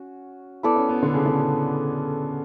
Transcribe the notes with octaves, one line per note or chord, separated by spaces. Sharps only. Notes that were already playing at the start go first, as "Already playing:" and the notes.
Already playing: C#4 F#4
B3 E4 A4 D5
C#4
B3
D3
C#3
D3
C#3